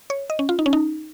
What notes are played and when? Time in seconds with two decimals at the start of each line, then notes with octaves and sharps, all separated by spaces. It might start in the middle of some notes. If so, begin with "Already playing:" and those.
0.10 C#5
0.30 D#5
0.39 C#4
0.49 F4
0.59 D#4
0.66 C#4
0.73 D#4